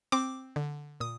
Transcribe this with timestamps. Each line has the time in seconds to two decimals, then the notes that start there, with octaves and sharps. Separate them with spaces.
0.12 C4 D6
0.56 D3
1.00 A#2 D#6